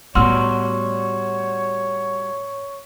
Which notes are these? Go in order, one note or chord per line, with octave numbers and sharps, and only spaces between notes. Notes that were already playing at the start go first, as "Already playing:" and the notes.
A2 G3 B3 F#4 C#5 C6 E6 F6